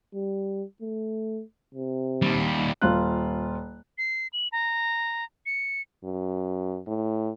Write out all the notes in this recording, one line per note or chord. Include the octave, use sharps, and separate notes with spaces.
G3
A3
C3
D#2 G3
D#1 F4 F#6
C7
F#7
A#5
C#7
F#2
A2